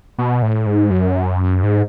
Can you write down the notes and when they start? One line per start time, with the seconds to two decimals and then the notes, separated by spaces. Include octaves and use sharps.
0.18 B2
0.42 A2
0.66 G#2
0.90 F#2
1.63 G#2